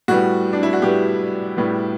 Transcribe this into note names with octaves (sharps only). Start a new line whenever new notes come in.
A2 G3 B3 F#4
D4
E4
F#4
A2 G3 B3 G4
A2 G3 B3